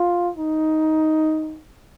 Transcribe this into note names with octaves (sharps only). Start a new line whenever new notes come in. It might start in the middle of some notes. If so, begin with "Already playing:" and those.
Already playing: F4
D#4